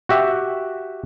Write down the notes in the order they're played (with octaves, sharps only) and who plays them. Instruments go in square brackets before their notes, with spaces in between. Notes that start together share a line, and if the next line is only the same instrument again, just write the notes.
[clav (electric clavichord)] F#4 G4 E5